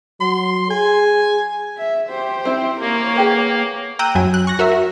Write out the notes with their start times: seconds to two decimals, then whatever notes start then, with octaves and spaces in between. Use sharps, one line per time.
0.21 F#3 C6
0.71 G#4 G#5
1.77 E5
2.09 G4 C5
2.45 C4 E4
2.80 A#3 A#4 C#5
3.16 B3 G4 G#4
3.99 G5 A#5 E6 F#6 G6 D#7
4.15 F#2 F#3 G#5
4.34 F#6
4.47 C#6 F#6 A#6
4.59 F#4 A#4 C#5 E5
4.72 F#4